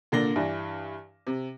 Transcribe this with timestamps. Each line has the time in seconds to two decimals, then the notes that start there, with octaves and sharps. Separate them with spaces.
0.12 A#2 D3 A#3 D5 A#6 G7
0.36 G2 E3 D4
1.27 C3